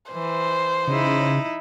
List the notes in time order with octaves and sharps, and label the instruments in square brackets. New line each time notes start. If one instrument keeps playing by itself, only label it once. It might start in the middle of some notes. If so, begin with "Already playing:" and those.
[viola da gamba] E3 [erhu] C5
[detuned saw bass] C#3 [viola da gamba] D#4 E4